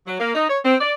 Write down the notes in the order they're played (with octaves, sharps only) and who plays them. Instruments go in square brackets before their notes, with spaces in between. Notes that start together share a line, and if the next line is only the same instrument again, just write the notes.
[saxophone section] F#3
A#3
D#4
C#5
C4
D5